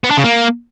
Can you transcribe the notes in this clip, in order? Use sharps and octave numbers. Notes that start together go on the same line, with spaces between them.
B3
D4
C#3
A#3